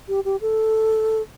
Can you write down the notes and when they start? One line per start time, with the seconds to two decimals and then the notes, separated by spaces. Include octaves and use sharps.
0.09 G4
0.25 G4
0.41 A4